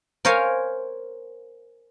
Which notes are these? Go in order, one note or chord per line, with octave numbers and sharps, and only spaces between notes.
A#4 C5 C#5 F5 G#5